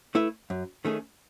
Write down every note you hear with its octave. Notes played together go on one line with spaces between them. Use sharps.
A3 E4 B4 E5
F#2
D#3 A3 C#4 G#4